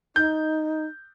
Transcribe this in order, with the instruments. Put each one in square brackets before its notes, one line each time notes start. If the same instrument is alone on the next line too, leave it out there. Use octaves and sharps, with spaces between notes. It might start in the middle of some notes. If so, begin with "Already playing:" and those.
[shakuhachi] D#4 [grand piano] G6